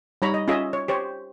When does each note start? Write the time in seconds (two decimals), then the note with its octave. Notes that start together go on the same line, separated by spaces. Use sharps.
0.22 G3 D#4 C#5 A#5 B5
0.34 D#5
0.48 C#4 F4 G#4 D#5 E5
0.73 C#5
0.88 G4 C5 C#5